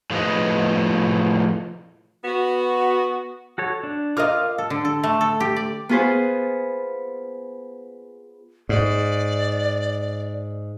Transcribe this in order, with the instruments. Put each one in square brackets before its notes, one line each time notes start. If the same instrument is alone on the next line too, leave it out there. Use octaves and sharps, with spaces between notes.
[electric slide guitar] A2 F3 G#4 B4 D#5
[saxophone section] B3 F#4
[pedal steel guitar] F#4 A4 C#5
D4
[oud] F4 A#4 D#5 [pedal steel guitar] D6 F6
[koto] A4
D3
A4
A3
A4
G4
D5
[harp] B3 F4 G#4 B4 C5
[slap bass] G#2 [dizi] D5